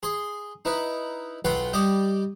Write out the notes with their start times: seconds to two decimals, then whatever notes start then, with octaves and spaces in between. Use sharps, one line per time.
0.03 G#4 C6
0.65 D#4 E4 B4
1.45 B1 F4 B4 F#5 G5 C6
1.73 G3 G4 D#5 D6